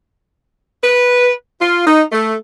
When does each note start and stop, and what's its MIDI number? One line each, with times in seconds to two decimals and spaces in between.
0.83 1.32 71
1.60 1.85 65
1.86 2.02 63
2.12 2.35 57